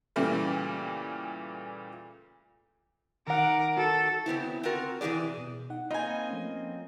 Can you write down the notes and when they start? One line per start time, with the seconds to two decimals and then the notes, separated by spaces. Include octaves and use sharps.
0.16 A#2 C#3 E3 G3 A3
3.28 D#3 A#4 F#5 D6
3.77 F#4 A4
4.26 C#3 B3 C4 E4
4.63 C4 F4 F#4 A#4
5.01 C3 E3 B3 G#4 D5
5.38 B2
5.70 D#4 F#5
5.91 A#3 C4 D#4 F4 D#5 G#5 B5
6.29 F3 A3 C#4